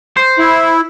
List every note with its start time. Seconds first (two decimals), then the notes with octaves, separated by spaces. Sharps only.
0.17 C5
0.39 E4